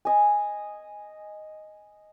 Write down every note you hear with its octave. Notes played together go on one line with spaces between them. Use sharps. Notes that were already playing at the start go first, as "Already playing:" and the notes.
D#5 G#5